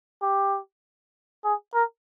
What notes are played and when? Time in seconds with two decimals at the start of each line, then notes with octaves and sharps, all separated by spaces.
0.22 G4
1.44 G#4
1.74 A#4